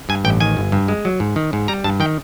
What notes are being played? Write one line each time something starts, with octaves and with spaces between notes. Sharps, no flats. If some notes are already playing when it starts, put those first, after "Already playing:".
G2 G#5
A1 G5
D#3 G#5
G1
G2
G#3
F#3
G#2
D#3
G#2
G3 A#5
G2 A5
D#3 G5